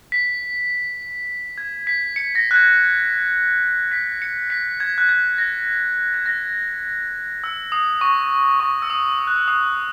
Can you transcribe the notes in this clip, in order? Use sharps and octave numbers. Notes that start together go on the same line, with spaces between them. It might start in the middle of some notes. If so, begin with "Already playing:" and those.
B6
G#6
B6
C#7
A#6
F#6
G#6
B6
C#7
B6
G#6
F#6
G#6
A#6
G#6
A#6
E6
D#6
C#6
C#6
E6
D#6
E6
F#6
E6
D#6